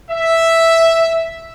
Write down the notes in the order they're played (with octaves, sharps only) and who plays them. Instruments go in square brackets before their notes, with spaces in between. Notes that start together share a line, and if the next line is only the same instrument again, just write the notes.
[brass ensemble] E5